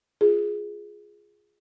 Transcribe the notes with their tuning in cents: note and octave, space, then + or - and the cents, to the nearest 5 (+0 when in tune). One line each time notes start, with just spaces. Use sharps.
F4 +0 G#4 +0